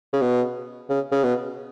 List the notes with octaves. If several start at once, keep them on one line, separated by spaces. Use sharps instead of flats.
C#3
B2
C#3
C#3
B2